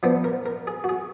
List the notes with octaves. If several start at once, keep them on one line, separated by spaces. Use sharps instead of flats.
F3 B3 D4
A#4
A#4
G#4
F#4
G#4